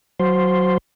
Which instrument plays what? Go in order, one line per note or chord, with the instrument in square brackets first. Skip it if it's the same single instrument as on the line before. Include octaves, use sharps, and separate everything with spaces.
[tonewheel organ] F#3 C5